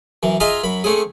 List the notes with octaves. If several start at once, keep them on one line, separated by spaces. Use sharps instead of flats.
F#2 E3
F4 G#4 D#5 E5 G#5 A#5
F#2 B5
A3 C4 C#4 G#4